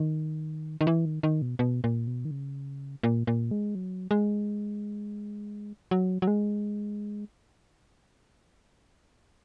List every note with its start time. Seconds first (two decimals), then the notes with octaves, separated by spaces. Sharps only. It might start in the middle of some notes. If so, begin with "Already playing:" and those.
Already playing: D#3
0.81 D#3
0.87 E3
1.05 D#3
1.23 D#3
1.42 B2
1.59 B2
1.84 A#2
2.07 B2
2.25 D#3
2.31 C#3
3.03 A#2
3.27 A#2
3.51 G#3
3.75 F#3
4.11 G#3
5.91 F#3
6.22 F#3
6.27 G#3